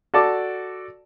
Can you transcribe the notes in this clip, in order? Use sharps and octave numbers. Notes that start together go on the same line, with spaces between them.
F#4 A4 D5 A5 D6